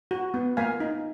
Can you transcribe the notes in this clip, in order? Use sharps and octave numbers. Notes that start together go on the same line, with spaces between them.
F#4
B3
A#3 F5 G#5
D#4